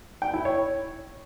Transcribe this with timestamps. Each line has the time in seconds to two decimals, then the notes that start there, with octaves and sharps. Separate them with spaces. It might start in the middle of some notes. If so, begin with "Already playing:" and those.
0.22 G5
0.33 E4
0.45 C#5